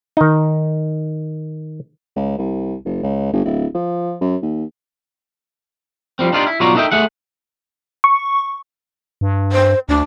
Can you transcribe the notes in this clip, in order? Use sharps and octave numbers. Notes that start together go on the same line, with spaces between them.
D#3 D#4
C#2
C2
F#1
C#2
G1
D1
F3
F#2
D#2
F3 G3 C4
D4 D#4 F4 G4 C#5 D5
E4
B1 F4 F#4 C#5 D5 A#5
B3 D#4 A4 D#5 E5 G5
A3 G#4 F#5
C#6
G2
C5
D2 D4